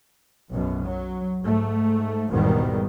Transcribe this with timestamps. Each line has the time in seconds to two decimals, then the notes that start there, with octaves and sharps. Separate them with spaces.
0.51 B1 F#2 B2
0.84 F#3
1.42 G#2 A3
2.29 G#1 E2 G#2 B2 D#3 G3